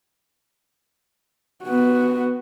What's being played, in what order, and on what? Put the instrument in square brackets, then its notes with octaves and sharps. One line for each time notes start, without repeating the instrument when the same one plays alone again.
[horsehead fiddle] B3 F#4